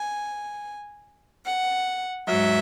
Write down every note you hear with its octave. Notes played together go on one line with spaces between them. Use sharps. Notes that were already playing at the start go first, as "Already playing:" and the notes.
Already playing: G#5
F#5
G#2 F#3 E5